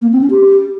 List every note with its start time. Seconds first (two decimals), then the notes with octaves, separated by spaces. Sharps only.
0.02 A#3
0.12 C4
0.21 C#4
0.30 G4